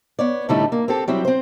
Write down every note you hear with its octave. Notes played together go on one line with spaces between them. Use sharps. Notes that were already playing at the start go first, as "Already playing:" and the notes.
B3 C#5 D5
A2 D3 G3 A3 D#4 E4
A#3
C4 G4 A4
F#3 G3 C4 E4
C4 C5